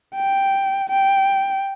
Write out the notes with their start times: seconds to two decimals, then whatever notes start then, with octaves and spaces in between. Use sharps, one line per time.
0.16 G5
0.89 G5